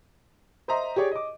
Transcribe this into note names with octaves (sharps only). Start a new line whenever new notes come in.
C5 D#5 E5 A#5 C6
G4 G#4 C#5 D5
D#5 D6